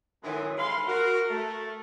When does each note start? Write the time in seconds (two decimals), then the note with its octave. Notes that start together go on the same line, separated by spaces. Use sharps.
0.23 F#2 A2 D#3 E3 F#3 G#3
0.57 G#3 F5 B5 C6
0.87 F#4 A#4
1.30 A3